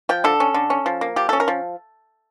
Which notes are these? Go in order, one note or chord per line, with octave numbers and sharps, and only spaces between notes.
F3 G5
D3 A4
C#4
D3
C#4
F3
A#3
F3 G4
C#4 A4
A#4
F3